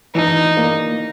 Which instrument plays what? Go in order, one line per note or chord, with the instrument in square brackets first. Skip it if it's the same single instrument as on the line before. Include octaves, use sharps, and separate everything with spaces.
[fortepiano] E3 [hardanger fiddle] D#4
[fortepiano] A#3